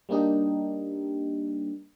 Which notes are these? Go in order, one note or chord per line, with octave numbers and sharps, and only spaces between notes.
G3 A#3 D4 D#4 G4